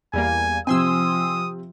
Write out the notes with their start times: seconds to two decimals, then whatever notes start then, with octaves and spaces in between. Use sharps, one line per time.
0.13 E2 G3 A#3 G#5
0.67 C3 F3 C4 G#5 C6 D#6 E6